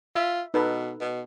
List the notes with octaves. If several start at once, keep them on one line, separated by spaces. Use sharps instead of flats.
F4 E5
B2 D#4 A4 B4
B2